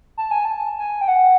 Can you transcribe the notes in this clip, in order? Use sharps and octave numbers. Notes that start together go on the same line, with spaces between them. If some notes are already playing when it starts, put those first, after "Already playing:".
A5
G#5
A5
G#5
G5
F#5